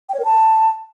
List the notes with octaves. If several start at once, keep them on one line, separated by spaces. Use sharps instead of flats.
G5
C#5
A#4
A5